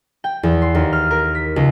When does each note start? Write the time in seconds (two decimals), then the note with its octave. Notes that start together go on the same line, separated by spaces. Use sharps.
0.24 G5
0.43 E2
0.62 C6
0.75 D#2
0.93 F6
1.11 A#4
1.35 B6
1.56 C#2